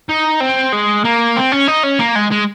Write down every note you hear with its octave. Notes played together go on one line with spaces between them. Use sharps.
D#4
C4
G#3
A#3
C4
C#4
D#4
C#4
A#3
G#3
G#3